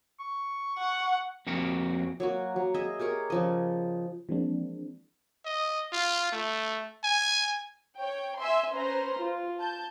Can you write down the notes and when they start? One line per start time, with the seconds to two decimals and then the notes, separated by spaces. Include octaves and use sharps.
0.20 C#6
0.78 F#5
1.47 F2 A#3 F#4 G4
2.20 F#3 A#3 F#4
2.56 F#3
2.74 G#4 D#5 E5
2.99 G4 G#4 A#4 C#5
3.30 C#3 F3 D#5
4.29 E3 F3 G#3 A#3 C4 D4
5.45 D#5
5.92 F4
6.32 A3
7.04 G#5
7.98 C#5 G5
8.37 E5 G#5 C6
8.72 C#4 B4 C5 A#5 C6
9.19 F4
9.58 A5 G6